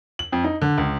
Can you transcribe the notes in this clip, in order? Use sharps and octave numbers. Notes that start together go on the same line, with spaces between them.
F#7
F2
D#4
D3
C#2